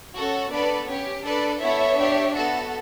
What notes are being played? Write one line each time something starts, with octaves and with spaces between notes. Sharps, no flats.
C#4 F#4 A4
B3 D4 A4 B4 D5
C#4 G4 C#5
D4 A4 B4 D5
B3 E4 A4 C#5 E5
D4 G4
B3 F#4 A4